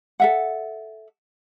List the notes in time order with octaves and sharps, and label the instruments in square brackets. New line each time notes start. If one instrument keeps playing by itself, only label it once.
[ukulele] A4 E5 F#5